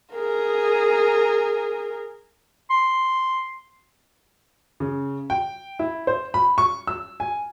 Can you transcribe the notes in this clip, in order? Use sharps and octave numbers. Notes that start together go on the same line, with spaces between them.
G#4 A#4
C6
C#3
G5
E4
C5
B5
C#6
E6
G#5